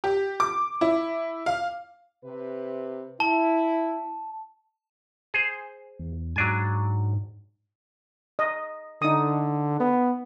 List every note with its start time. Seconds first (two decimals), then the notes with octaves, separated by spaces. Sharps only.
0.04 G4
0.40 D6
0.81 E4
1.46 F5
2.24 C3 B4
3.20 E4 A5
5.34 G#4 C5
5.99 E2
6.36 G#2 F#3 D4 G#5
8.39 D#5
9.02 D3 D#4 D#6
9.80 B3